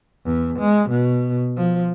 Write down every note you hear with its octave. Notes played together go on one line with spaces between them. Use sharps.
E2
G#3
B2
F3